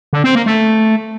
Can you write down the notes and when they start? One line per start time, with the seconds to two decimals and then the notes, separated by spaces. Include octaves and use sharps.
0.13 D3
0.24 C4
0.35 A#3
0.46 A3